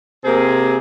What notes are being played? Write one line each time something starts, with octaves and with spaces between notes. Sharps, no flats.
C3 A#3 C4 G#4